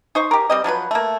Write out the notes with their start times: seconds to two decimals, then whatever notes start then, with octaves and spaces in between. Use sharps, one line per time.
0.15 D#4 C5 C#6
0.31 G4 A#4
0.50 G3 C4 D#5
0.64 F3 F#3 F4 B4
0.91 A3 A#3